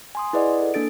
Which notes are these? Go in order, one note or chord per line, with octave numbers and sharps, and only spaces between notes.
G#5 C6 D#6
E4 G#4 B4 D5 D#5 F#5
A4
A#3 D4 A4 A6 D7